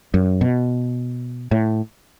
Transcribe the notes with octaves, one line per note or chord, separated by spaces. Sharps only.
F#2
B2
A2